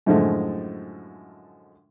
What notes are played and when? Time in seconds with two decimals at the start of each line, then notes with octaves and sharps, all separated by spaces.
0.06 F#2 A2 D3 F3 G#3 A3